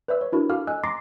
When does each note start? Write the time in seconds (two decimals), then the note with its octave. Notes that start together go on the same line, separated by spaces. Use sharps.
0.08 B4 C5 D5 E5 E6
0.21 C#5
0.32 D4 E4 F#4 A#4
0.49 F#4 A4 F5 D6 F6
0.67 D#5 G#5 E6 F#6
0.83 A#5 C6 D6 A6 A#6 C7